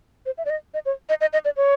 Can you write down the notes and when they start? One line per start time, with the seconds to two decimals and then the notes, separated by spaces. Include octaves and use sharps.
0.26 C5
0.38 E5
0.45 D5
0.50 D#5
0.74 D#5
0.86 C#5
1.09 D#5
1.21 D#5
1.33 D#5
1.45 D5
1.57 C#5